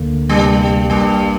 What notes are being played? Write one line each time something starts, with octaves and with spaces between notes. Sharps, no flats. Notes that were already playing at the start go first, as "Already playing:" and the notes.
Already playing: D2 D3 A#3
D2 G2 C3 G3 A#3
A#1 G2 A#2 G3 A#3 G4